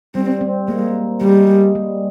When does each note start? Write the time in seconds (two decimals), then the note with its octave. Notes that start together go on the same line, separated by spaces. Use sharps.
0.15 G3 C4
0.41 C4
0.68 G#3 A#3
1.21 G3 G#3
1.75 G3